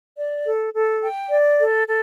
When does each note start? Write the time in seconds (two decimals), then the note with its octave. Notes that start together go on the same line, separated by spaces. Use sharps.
0.17 D5
0.46 A4
0.74 A4
1.02 G5
1.30 D5
1.59 A4
1.87 A4